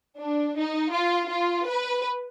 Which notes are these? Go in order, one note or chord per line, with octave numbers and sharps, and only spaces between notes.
D4
D#4
F4
F4
B4